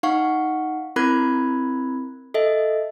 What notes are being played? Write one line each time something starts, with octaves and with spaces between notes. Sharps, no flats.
D#4 F5 F#5 C#6
C4 E4 A#4 B5 F#6 G#6
A4 D#5 E5